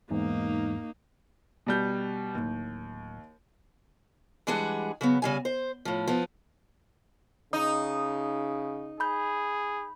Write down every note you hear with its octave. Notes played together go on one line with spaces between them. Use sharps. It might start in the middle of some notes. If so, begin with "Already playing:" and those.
E2 G#2 A#3 D#4
B2 G3 G6
D1 D#2
E3 G3 G#3 D4 G#4 F#5
C#3 F#3 B3
C#3 G3 G#5
C5
A2 F3
F3 B3
C#3 D#4 D#6
G#4 B5 G6